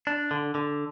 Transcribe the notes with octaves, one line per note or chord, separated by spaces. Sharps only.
D4
D3
D3